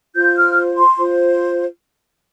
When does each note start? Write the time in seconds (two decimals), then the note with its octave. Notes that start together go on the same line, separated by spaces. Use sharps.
0.14 F4 C5 G6
0.36 F6
0.77 C6
0.98 F4 C5